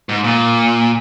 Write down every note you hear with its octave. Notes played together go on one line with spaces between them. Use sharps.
G#2
A#2